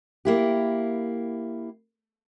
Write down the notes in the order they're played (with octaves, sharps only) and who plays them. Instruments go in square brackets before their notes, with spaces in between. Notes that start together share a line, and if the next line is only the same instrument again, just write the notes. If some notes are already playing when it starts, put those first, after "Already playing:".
[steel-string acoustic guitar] A#3 E4 G4